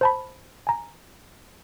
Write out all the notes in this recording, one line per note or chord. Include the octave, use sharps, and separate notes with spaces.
C5 A5 B5
G#5 A#5